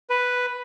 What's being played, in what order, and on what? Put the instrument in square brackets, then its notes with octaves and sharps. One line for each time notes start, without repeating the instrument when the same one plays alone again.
[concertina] B4